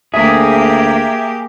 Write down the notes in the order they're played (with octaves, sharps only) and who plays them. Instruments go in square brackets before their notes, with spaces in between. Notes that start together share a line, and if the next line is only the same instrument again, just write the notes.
[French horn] D2 [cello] A#3 G4 [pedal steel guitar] G#4 [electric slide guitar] E5